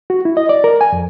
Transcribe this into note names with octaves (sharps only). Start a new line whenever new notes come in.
F#4
E4
D#5
D5
A#4
G#5
F2